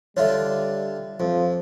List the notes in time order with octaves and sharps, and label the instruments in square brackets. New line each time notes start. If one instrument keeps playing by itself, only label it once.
[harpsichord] D3 D4 F4 [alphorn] G3 [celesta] C#5 E5
[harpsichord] F2 [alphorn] F3